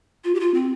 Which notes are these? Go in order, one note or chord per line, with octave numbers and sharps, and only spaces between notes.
F4
G4
F4
C4